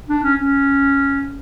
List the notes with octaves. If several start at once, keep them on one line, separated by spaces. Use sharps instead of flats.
D4
C#4
C#4